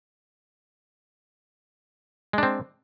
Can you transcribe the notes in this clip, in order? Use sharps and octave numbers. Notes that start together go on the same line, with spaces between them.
G#3 C4 D4